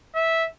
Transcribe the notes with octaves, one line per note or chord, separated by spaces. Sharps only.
E5